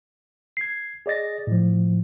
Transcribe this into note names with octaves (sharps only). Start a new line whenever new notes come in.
G#6 C7
G#4 D5 D#5 A6 A#6
A2 F3